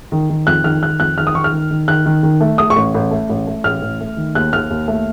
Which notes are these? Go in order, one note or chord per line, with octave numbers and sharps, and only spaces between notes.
D#3
D#3
F2 F#6
D#3 F6
D#3 F#6
F2 F#6
D#3 F6
D#6
D#3 C#6
F6
D#3
D#3
D#3 F#6
D#3
D#3
A3
A3 D#6
C#6
A1
A1
A3
A1
A3
A1 F6
A1
A3
D#3
D#2 F#6
D#2 F6
D#2
A3